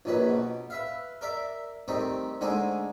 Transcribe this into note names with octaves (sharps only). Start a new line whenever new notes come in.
A#1 D#3 F#3 B4
B2
B4 E5 F5
A#4 D5 E5
D#3 G3 A3 C4 D#4
D3 G#3 A3 D#4 G#4 C5